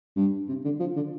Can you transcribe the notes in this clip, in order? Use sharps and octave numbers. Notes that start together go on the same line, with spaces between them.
G2
C3
D3
F3
D3